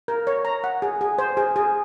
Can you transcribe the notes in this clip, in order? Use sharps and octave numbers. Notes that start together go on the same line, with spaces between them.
A#4
C#5
A#5
F#5
G#4
G#4
C5
G#4
G#4